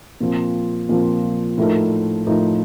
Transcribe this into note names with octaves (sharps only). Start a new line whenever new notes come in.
A#2 F3 C4
A#2 F3 C4
A2 F3 A3 D#4 A#4
A2 F3 A3 D#4 A#4